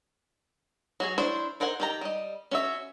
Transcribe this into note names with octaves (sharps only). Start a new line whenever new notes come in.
F#3 F#4 G#4
D4 E4 C5 C#5
D#4 A#4 C5 F#5 G#5
D#3 G4 A#5
G3 D#5
C#4 F#4 E5